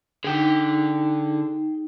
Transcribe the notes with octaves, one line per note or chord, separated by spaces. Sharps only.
D3 D#4 G#4 G5